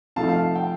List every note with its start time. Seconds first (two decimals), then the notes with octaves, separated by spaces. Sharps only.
0.16 C3 F3 A3 D#4 A4 F5 A5
0.29 F5
0.42 F5
0.55 G5